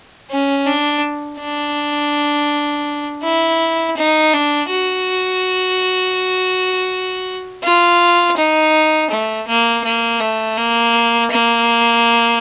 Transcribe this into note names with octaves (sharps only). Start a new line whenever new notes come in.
C#4
D4
D4
E4
D#4
D4
F#4
F4
D#4
A3
A#3
A#3
A3
A#3
A#3